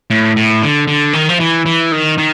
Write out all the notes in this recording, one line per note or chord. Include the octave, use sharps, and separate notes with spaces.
A2
A2
D3
D3
D#3
F3
E3
E3
D#3
D#3